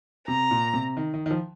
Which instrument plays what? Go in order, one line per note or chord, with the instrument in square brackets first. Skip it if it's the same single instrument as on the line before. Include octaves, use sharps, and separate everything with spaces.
[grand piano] C3 [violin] A#5
[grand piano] A#2
C3
D#3
D#3
D#3
F3